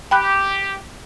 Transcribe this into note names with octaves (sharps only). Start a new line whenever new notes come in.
G4 G5 B5 F#6